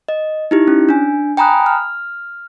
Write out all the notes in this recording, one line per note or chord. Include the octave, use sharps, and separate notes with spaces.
D#5
D#4 E4 G4
C#4
D4 G#5
G5 G#5 A#5 B5 D#6 F#6
F6